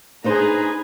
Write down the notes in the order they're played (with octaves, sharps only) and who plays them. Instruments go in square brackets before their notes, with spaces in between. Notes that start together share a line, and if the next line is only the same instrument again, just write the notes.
[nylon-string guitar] D4 D#4 C5 [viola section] G#4 B4 A#5